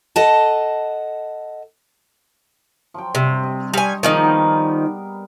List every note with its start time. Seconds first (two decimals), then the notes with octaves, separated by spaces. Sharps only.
0.16 A4 D#5 F#5 A5
2.94 F3 F#3 G5
3.15 G2 C3 C6 C#6
3.43 D#5
3.74 G3 D#5 G#5 A5 C#6
4.03 D#3 F3 A#3 D4 D#4 G#4
4.24 G3 B3 A#4